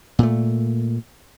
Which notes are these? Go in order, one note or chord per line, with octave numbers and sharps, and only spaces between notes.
A#2 A3